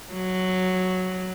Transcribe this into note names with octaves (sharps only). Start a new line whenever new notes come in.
F#3